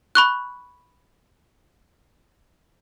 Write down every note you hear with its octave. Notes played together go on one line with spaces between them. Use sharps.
B5 C#6 F#6